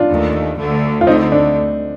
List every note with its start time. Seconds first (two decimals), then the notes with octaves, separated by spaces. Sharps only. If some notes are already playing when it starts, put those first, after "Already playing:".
Already playing: D4 F4
0.10 D#2 D#3 A3
0.59 D2 D3 A3
1.01 F4
1.07 D2 D3 A3 C4 D#4
1.32 D4